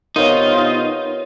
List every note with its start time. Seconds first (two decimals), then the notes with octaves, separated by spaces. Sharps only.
0.16 C3 B3 D#4 F4 A#4 C#5